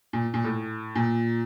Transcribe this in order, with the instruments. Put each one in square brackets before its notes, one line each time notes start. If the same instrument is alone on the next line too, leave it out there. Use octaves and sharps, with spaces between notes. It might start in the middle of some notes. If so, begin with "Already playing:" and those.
[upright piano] A#2
A#2
A2
A#2